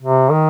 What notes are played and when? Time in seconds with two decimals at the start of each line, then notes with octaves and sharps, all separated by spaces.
0.01 C3
0.31 D#3